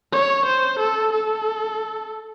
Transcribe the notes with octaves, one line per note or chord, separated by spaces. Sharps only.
C#5
C5
A4
A4